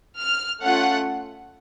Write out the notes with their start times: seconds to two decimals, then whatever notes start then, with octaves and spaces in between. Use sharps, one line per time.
0.19 F6
0.63 A3 C#4 F4 F#5